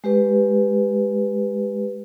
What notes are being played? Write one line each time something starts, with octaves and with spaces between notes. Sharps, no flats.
G#3 G4 B4